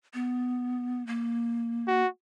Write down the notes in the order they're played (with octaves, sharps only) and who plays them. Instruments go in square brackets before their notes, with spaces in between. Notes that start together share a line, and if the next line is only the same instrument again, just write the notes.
[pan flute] B3
A#3
[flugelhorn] F#4